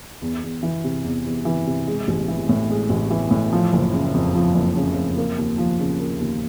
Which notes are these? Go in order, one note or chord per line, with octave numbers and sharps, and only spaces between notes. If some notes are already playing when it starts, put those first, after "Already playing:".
E2
E2
E3
C3
E2
E2
E3
C3
G#3
A1
E3
A2
G#3
A1
E3
A2
F3
F#1
C#3
F2
F3
F#1
C#3
F2
A#3
D#2
F3
C#3
A#3
D#2